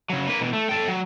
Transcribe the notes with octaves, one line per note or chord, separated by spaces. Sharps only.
C#3 F#3
A#3 B4
B2 E3
A3
A4 G5
F#3